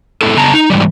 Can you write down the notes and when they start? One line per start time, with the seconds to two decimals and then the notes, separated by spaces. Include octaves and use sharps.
0.21 G#3 A3 B3 E4 A4
0.37 C#3 B3 A5 A#5
0.54 D#4
0.70 G#2 C3 E3 G3